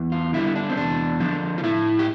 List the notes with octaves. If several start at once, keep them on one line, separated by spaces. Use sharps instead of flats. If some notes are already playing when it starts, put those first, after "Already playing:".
Already playing: E2
F4
D3 G3 E4
D4
C4
E2 D4
D3 F3 D4
F4
A2 E4
G4